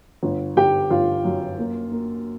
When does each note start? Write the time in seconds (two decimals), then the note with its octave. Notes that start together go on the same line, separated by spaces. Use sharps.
0.23 G1
0.56 G1 G4 G5
0.90 G1 F4 F5
1.24 F#2
1.59 A#3
1.92 A#3